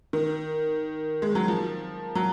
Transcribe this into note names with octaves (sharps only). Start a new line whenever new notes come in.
D#3
G#3
F#3
F3
F#3